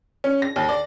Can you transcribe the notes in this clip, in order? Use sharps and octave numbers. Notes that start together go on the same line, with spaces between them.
C#4
A#6
D#2
D5